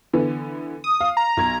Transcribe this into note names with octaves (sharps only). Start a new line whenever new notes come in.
D3 E3 B3
D#6
F5
A#5
B1 G#6